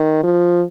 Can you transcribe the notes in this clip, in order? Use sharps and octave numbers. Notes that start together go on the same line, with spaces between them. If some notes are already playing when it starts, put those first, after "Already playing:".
Already playing: D#3
F3